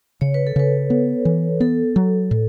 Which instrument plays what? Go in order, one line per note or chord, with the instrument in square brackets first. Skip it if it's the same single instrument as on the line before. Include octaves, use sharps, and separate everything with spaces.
[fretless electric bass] C#3 [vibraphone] C#5
[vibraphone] B4
A4
[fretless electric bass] C#3 [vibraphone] B4
[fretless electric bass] B3
E3
[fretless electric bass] B3 [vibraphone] A4
[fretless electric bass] F#3
A2